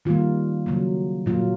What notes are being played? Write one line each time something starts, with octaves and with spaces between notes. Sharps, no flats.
D#3 G3 A#3 F4
C#3 F#3 A#3
A#2 F#3 A#3 F4